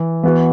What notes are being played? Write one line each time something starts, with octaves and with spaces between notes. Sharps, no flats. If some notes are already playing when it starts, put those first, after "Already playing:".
Already playing: E3
E3 B3 F#4